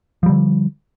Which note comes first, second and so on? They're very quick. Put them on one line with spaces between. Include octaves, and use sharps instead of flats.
F3 G3 D3